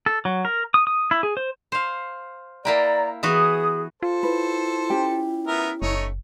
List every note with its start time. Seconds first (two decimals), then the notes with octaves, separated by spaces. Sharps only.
0.06 A4
0.25 F#3
0.45 A#4
0.74 D#6
0.87 D#6
1.11 E4
1.23 G#4
1.37 C5
1.72 C5 F5
2.65 A#3 E4 D5 G5 A#5
3.23 E3 B3 F#4 G#4 D#6
4.03 F4 A4 C5
4.23 E4 B4
4.90 C#4 G4 G5
5.47 B3 A#4 E5
5.82 F#1 A3 D#4 C#5